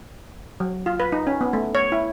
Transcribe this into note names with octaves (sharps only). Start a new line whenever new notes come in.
F#3
F4
B4
D#4
C#4
B3
A3
C#5
E4